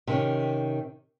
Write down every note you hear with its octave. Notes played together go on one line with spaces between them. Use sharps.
C3 D#3 C#4